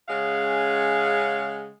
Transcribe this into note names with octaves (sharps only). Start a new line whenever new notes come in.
C#3 G#3 C#4 F5 F#5